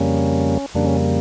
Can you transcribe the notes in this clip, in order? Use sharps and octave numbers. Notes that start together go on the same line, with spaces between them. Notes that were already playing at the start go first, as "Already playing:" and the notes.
Already playing: F2 C#3 G3 A#3 C#4
F2 C#3 G3 A#3 D4
C#4